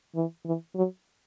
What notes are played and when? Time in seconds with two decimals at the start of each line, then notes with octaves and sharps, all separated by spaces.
0.15 E3
0.45 E3
0.75 F#3